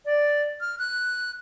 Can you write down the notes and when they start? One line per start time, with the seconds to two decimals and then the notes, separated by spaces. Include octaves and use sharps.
0.05 D5
0.61 F6
0.79 F#6